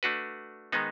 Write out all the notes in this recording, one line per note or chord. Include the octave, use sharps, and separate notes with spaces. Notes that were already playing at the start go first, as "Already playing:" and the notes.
A3 D4 F#4 B4
D#3 G#3 B3 D#4